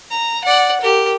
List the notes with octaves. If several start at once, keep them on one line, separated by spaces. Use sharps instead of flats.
A#5
D5 F#5
G4 A#4